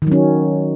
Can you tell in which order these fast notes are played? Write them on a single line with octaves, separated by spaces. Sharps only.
D#3 F#3 C#4